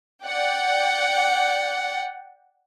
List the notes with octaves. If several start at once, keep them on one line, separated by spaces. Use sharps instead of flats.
D5 F#5 G5